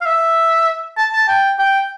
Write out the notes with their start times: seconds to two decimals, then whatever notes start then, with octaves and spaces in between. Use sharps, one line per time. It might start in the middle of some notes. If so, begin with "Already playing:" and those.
0.01 F5
0.06 E5
0.98 A5
1.13 A5
1.28 G5
1.59 G5